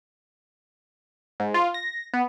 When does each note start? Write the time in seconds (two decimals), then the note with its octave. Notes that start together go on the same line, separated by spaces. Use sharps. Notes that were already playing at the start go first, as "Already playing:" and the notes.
1.40 G#2
1.54 F4
1.74 A#6
2.14 B3